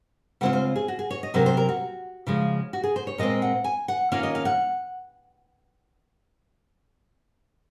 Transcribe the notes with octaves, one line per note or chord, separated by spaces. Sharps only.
C#3 G#3 C4 F4 F#5
C5
G#4
F#4
G#4
C#5
D#5
C3 F#3 C4 A#4
C5
A#4
F#4
C#3 F3 G#3
F#4
G#4
C5
C#5
A#2 G#3 C4 D#5
F#5
G#5
F#5
D#3 A#3 C#4 F4 F5
D#5
F5
F#5